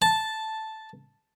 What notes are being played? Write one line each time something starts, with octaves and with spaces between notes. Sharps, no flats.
A5